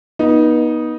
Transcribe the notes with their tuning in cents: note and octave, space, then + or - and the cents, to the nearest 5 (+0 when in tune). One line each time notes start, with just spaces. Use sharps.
B3 -35 D#4 +0